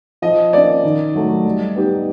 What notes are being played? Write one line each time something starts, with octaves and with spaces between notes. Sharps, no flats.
F3 D#5
A#3 C#4 D5
D#3
F#3 A3
G3
B3 D#4 G4